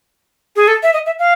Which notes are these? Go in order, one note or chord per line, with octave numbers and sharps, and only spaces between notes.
G#4
A4
E5
D#5
E5
F5